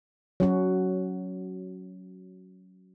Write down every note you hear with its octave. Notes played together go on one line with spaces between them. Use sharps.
F#3 C#4 F#4